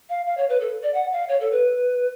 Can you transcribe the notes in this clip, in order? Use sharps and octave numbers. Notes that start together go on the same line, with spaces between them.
F5
F5
C#5
B4
A4
D5
F#5
F5
C#5
A4
B4